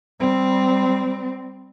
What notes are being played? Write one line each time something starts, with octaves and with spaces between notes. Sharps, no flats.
G3 C4